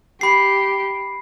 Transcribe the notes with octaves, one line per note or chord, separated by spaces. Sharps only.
G4 B5 C7